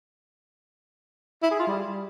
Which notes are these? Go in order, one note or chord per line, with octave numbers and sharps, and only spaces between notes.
E4
G#4
F4
G3